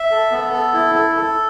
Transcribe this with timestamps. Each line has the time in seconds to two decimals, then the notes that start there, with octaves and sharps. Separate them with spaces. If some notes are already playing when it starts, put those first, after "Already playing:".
Already playing: E5
0.11 A4
0.31 B3
0.53 A4
0.74 E4
0.95 A4
1.16 A4